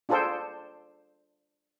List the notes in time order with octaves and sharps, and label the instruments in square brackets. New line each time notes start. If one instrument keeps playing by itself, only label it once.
[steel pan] D4 F4 G#4 A4 C5 G5